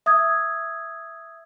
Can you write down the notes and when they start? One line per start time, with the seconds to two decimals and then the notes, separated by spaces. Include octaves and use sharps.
0.06 E5 D#6 E6 G#6